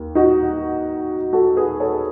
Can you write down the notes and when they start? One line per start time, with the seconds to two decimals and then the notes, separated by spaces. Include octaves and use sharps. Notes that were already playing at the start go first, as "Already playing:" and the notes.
Already playing: D#2
0.15 D#4 F#4
1.33 F#4 A4
1.57 G#4 B4
1.80 A4 C#5